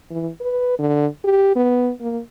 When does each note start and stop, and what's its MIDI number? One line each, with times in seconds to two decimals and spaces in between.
0.10 0.29 52
0.41 0.79 71
0.79 1.06 50
1.24 1.54 67
1.56 1.91 59
2.01 2.20 58